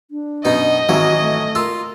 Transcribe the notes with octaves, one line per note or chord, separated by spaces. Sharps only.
D4
F#2 B2 B3 D#4 D#5
G#1 E3 F#3 D#4 F#4 E5
A3
F4 A#4 E6